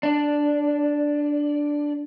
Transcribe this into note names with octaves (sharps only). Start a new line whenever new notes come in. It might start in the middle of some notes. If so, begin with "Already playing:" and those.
D4 D5